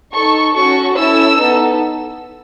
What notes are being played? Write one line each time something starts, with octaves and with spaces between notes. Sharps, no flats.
D#4 A4 C#6
C#4 F#4 A4 C#6
C#4 E4 A4 E6
B3 D#4 A4